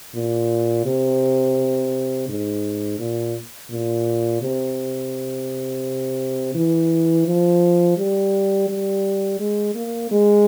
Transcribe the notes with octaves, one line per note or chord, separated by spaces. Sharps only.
A#2
C3
G#2
A#2
A#2
C3
E3
F3
G3
G3
G#3
A#3
G#3